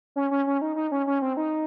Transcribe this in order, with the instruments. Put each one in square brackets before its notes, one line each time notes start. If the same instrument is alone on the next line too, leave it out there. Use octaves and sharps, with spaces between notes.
[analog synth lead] C#4
C#4
C#4
D#4
D#4
C#4
C#4
C4
D#4